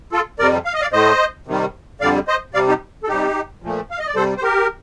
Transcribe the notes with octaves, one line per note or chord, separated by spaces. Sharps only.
F4 A4
F2 C3 G3 A#4 D5
F5
D#5
D5 F5
A2 A3 C5 D#5
C3 D#3 G3
F2 D3 G3 D5 F5
C5 D#5
C3 G3 D5 F5
D#4 G4
A4
C3 G3 D#4 G4
A#2 F3 A3
F5
D#5
D5
C3 G3 A4 C5
C5
G4 A#4